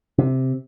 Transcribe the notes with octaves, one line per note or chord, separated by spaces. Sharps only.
C3